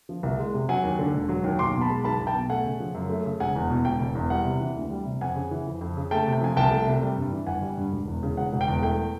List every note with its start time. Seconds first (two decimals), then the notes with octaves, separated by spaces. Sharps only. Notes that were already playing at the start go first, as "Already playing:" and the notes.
0.09 F3
0.23 C2
0.39 G#3
0.54 C3
0.69 F#3 F#5 G#5
0.83 D#2
0.99 D3
1.14 E1
1.29 F#3
1.44 D#2
1.59 B1 C6 D6
1.75 B2
1.81 A5 B5
1.90 G#3
2.04 B1 A5 B5
2.20 B1
2.27 G5 A5
2.34 B2
2.49 A3 F#5 G#5
2.65 C#3
2.80 F3
2.95 F#2
3.09 A3
3.25 C#3
3.40 E1 F#5 G#5
3.56 E2
3.70 B2
3.85 E1 G5
4.01 E1
4.15 E2
4.30 G3 F#5
4.45 C3
4.60 E3
4.76 D2
4.90 G3
5.06 C3
5.21 F2 F#5 G#5
5.36 C#3
5.51 E3
5.66 F2
5.81 F2
5.97 C#3
6.11 A3 G5 A5
6.27 C3
6.33 G5
6.41 F3 G#5
6.57 C2 G5 A5
6.71 A3
6.87 C3
7.02 G3
7.17 G2
7.32 E3
7.47 G1 F#5 G#5
7.62 G3
7.77 G2
7.92 E1
8.08 E2
8.23 C#3
8.37 E1 F#5
8.52 E1
8.61 G5
8.68 E2
8.82 A3 G5